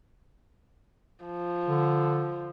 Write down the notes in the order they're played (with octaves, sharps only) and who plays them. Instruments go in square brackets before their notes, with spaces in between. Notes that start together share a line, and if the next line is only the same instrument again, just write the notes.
[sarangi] F3
[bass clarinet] D3